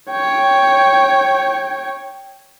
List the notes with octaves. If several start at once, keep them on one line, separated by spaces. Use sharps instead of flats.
C#5 G5